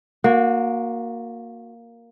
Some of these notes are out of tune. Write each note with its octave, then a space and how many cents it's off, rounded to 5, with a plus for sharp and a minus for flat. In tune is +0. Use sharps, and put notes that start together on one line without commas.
A#3 +0 F#4 -25